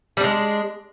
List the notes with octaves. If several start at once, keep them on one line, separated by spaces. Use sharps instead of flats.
G3 G#3 D4